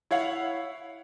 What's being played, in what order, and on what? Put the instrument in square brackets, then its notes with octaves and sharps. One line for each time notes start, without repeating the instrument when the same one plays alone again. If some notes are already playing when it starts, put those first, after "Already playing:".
[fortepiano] E4 C#5 F5 F#5